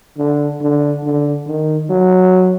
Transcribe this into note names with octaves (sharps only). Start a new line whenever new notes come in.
D3
D3
D3
D#3
F#3